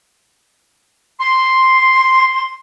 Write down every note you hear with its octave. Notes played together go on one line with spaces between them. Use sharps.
C6